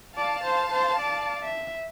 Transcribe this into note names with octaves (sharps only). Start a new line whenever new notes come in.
D5 F5 A5
C5
C5
D5
E5